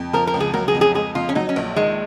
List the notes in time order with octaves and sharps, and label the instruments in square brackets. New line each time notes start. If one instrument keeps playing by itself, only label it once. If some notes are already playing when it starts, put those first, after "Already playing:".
Already playing: [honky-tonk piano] F2
[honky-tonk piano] F3 [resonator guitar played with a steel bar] A#4
[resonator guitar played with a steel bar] A#4
[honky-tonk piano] C#2
[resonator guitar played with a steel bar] G#4
[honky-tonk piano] F#3 [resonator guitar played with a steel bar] A#4
[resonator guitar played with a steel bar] G#4
[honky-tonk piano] F2
[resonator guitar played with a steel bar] G#4
[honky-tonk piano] G#3 [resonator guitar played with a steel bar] G#4
[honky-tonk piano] F2 [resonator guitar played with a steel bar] F4
[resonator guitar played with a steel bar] C#4
[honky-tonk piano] F#3 [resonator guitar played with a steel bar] D#4
[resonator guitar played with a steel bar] C#4
[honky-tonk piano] A#1
[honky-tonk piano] D#3 [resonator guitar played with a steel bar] G#3